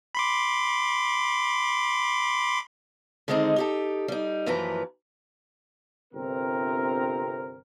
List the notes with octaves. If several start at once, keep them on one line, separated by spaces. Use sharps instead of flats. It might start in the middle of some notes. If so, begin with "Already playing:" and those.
B5 C6 D6
D3 D#3 G#3 C4 D4 D#4
D#4 G4 A4
G3 D#4
F#2 E3 F3 A#3 B4 A#5
G1 C3 C4 A#4